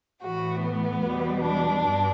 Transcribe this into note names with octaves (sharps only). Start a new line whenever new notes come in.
A2 E3 A3 F#4
B3
E2 B2 G3
D4
G2